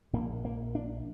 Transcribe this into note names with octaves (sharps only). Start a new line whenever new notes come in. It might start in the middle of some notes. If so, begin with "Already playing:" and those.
A#1 A#2 A#3
A#3
D4